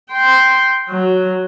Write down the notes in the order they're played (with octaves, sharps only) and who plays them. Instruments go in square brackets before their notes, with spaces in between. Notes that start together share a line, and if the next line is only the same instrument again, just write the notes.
[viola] G5 C6
F#3